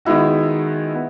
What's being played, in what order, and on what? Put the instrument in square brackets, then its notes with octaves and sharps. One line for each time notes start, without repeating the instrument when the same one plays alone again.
[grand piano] D#3 G#3 B3 D#4 F#4 [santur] E4
[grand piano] B3